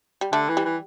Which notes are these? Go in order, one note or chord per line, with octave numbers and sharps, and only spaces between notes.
G3
D3 A3
E3
G3
E3